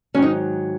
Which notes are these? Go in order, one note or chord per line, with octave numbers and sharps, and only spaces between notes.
G#2 D#3 F#3 C#4
D#4